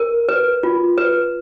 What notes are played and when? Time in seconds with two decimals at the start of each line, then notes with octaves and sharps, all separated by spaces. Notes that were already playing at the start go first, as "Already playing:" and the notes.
Already playing: A#4
0.29 B4
0.63 F4
0.98 B4